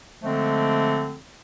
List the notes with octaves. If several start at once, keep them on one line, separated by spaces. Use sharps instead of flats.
D3 F3 G#3 A3 C4